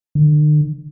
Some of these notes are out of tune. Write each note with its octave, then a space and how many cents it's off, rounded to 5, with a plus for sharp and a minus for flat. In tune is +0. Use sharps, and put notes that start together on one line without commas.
D3 +45